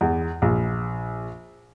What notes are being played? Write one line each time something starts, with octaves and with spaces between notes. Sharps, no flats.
E2
A#1